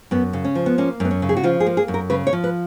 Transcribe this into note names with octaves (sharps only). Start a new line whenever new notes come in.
F#2 B3
C#3
C#4
F3
B3
A#3 C#4
F#2 B3
C#4
C#3
G#4
F#4
F3 F4
G#4
A#3
G#4
F#2
A#4
C#3 B4
C#5
F3
B4